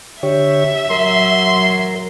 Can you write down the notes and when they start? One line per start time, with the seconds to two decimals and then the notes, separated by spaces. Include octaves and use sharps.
0.23 D3 G4 C#5 E5
0.90 F#3 A#4 C6